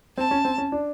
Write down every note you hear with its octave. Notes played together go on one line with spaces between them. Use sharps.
C4 A5
C#4
C4
C#4
D4